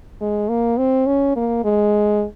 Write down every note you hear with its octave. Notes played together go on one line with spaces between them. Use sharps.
G#3
A#3
C4
C#4
A#3
G#3